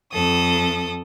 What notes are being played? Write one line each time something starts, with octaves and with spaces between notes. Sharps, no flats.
F2 A4 D#6